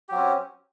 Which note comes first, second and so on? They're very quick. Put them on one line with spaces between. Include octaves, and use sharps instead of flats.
G4 F#3 C4 C#4